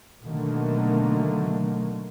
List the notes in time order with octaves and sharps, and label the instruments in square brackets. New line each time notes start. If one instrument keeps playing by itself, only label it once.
[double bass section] B2 D3 D#3 F#3 A3 A#3